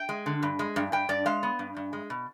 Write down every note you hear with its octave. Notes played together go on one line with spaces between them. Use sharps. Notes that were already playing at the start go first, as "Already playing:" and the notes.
Already playing: G5
G#3
D3
G2
G#3
G2
G2 G5
G2 D5
G#3 F5
B3
G2
G2
G#3
B2